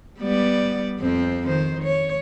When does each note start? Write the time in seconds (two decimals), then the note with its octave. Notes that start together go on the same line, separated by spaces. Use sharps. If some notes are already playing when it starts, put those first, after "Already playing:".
0.19 G3 B3 D5
0.99 F2 C4
1.47 D#3 C5
1.83 C#5